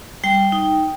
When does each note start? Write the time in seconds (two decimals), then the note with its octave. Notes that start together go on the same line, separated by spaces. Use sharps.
0.24 G3 G5
0.52 D#4